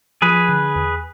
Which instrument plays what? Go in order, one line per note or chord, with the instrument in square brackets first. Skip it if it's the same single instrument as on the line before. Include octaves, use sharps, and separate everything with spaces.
[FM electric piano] F3 [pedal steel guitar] G#4 B4
[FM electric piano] D3
E2